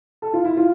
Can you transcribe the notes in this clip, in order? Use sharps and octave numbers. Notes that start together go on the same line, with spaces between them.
A4
F4
E4
F4